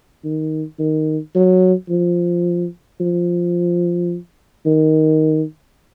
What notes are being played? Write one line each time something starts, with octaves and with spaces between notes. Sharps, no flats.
D#3
D#3
F#3
F3
F3
D#3